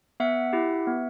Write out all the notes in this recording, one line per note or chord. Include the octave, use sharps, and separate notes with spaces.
B3 E5 F#5
E4 G4
B3